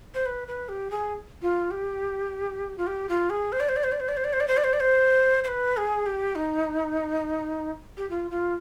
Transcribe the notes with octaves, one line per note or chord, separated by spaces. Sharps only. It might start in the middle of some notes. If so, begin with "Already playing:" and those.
C5
B4
B4
G4
G#4
F4
G4
F4
G4
F4
G#4
C5
D5
C5
D5
C5
D5
C5
D5
C5
D5
C5
D5
C5
D5
C5
D5
C5
C5
B4
G#4
G4
D#4
G4
F4
F4